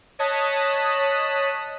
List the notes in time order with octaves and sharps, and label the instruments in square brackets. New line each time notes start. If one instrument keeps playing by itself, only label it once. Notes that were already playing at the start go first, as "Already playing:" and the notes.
[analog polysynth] C#5 D#5 A5 D#6 F#6 B6